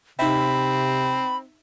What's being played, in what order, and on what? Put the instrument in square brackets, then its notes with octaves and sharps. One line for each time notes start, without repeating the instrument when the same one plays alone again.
[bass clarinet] C3 [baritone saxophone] C4 [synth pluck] D#4 E5 [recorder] B5